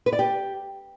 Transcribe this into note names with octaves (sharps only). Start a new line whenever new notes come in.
B4
D5
G4